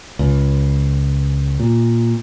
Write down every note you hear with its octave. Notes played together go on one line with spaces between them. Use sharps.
C#2
A#2